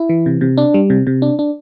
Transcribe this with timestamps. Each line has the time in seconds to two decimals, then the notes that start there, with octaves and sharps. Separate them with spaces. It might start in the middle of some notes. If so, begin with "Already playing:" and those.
Already playing: E4
0.09 E3
0.26 C3
0.41 C3
0.57 D4
0.74 G3
0.90 C3
1.07 C3
1.22 D4
1.39 D4